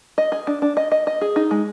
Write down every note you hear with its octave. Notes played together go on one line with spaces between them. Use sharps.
D#5
G#4
D4
D4
D#5
D#5
D#5
G#4
D#4
G#3